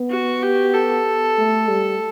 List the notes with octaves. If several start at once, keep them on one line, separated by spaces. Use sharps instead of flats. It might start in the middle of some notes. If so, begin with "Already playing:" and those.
Already playing: B3
F#4
G4
A4
A3
G3